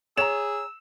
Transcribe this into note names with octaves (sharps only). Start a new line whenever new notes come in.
G#4 C#5 A#5 E6 E7